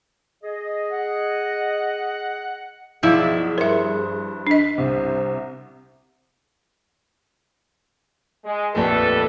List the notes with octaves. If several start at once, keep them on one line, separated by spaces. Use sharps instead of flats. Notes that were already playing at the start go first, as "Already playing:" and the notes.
G#4 D#5
F#5
B1 F3 E4 G#4 D5
G2 A#4 C5 E5
D4 D#5
C2 C3 C5
G#3
A#1 F2 A3 G4 A4 B4